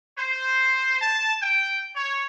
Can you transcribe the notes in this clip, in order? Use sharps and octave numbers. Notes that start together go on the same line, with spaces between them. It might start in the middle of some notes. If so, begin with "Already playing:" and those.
C5
A5
G5
C#5